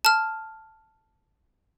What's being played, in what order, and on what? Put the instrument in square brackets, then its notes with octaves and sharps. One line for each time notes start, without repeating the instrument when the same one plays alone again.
[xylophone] A5 F6